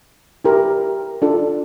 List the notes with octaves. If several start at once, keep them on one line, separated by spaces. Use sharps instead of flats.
E4 G4 A#4
D4 F4 A4